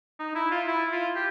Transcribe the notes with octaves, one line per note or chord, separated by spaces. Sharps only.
D#4
E4
F4
E4
F4
G4